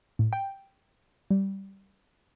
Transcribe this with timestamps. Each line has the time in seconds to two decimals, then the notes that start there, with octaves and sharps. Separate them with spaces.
0.19 A2
0.33 G5
1.30 G3